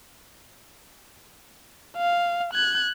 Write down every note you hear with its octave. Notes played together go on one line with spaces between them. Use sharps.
F5
F#6 G#6